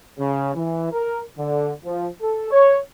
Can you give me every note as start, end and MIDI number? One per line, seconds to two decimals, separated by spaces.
0.19 0.55 49
0.55 0.90 52
0.92 1.20 70
1.38 1.72 50
1.85 2.07 53
2.22 2.49 69
2.51 2.78 73